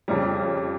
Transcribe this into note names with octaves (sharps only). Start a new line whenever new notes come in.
F2 C#3 G3